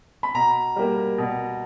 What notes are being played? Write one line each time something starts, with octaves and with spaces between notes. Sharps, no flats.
B5
B2 A#5
G3 A#3
B2